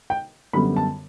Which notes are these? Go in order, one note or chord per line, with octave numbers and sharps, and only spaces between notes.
G5
F#2 D3 G3 B3 B5
A5